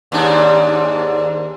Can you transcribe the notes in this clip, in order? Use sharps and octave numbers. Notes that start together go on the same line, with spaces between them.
D#2 G#2 D4